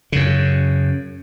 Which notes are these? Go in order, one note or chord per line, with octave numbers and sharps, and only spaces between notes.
F#2 C#3